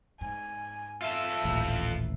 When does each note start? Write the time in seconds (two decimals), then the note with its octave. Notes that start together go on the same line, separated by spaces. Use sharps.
0.21 G#2 G#5
1.02 F4 A4 E5
1.45 D#1 A1